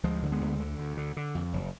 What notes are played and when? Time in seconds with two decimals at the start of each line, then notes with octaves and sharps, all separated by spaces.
0.04 D2 F3 G#3
0.22 D3
0.32 G#3 B3
0.41 D2
0.60 D3
0.78 D2
0.97 D3
1.17 D3
1.35 F2
1.53 F#1